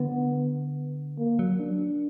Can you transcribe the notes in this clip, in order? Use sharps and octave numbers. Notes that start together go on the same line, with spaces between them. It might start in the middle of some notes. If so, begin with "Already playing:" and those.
Already playing: D3 B3
A#3
F#3
D4